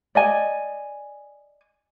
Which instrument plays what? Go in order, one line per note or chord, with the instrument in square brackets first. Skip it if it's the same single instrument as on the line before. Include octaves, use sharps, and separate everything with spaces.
[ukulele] D5 D#5 G#5